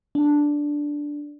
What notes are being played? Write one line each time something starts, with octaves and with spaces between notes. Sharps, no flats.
D4